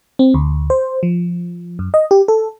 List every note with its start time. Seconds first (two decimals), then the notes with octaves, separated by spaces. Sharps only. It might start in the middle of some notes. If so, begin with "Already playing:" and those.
0.19 C4
0.34 D2
0.70 C5
1.03 F3
1.79 F#2
1.94 D#5
2.11 G4
2.28 A4